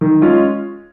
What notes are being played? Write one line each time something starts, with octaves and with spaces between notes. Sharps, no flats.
D#3
G#3 C#4 F4